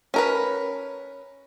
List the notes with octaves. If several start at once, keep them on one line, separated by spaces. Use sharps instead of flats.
C#4 A#4 B4